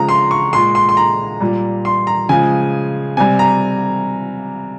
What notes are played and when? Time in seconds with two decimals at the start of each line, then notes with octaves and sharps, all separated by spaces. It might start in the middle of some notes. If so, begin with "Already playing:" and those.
Already playing: C#3 F3 G#3 A#5
0.09 C6
0.31 C#6
0.53 A#2 G#3 C6
0.75 C6
0.89 C6
0.97 A#5
1.41 A#2 G3
1.85 C6
2.07 A#5
2.29 C#3 F3 G#3 G#5
3.17 C3 G3 G#5
3.39 A#5